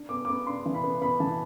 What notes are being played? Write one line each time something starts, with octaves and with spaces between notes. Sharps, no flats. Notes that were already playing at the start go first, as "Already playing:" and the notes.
Already playing: D4
B3 D6
D6
B3
D4 C6
E3
B5
B3
B3 B5
E3 A5